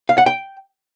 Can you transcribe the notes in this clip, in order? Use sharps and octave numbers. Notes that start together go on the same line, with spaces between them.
F5
F#5
G5